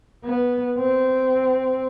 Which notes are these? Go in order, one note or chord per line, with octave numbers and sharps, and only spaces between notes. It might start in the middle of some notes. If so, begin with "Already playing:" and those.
B3
C4